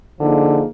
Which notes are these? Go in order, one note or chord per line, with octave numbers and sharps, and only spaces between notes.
D3 F3 A#3 D#4 G#4